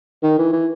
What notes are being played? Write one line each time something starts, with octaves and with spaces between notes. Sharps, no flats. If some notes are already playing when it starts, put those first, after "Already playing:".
D#3
E3
E3